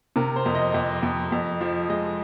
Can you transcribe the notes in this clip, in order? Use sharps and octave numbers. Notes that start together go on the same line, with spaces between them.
C3 A#4
C5
F2
D#5
F2
F2
F2
F3
G#3 D#5